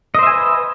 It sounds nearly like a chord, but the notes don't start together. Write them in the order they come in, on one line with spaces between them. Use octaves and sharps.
D#5 C5 E5 G#5 B4